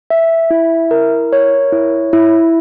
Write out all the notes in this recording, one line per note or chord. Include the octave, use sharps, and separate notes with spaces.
E5
E4
A#4
C#5
E4
E4